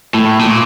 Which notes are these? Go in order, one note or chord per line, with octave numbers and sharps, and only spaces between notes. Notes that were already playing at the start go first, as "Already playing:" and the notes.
A2
A#2